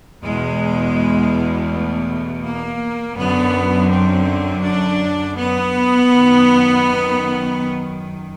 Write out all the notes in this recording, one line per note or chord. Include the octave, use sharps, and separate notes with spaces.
E2 B2 G#3
A3
A#3
F#2 D3 B3
C4
D4
B3
F#2 D#3